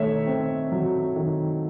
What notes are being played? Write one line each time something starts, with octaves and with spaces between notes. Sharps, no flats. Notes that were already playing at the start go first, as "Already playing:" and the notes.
Already playing: D#3 A3 C#5 E5
C4
F#3
D#3